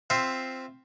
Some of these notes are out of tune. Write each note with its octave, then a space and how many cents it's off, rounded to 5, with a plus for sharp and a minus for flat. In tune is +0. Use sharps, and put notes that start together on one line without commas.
C4 +0 F4 +0 E5 +0